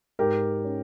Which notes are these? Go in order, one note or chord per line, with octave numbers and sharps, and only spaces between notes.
G#2 G4 A#4
C#4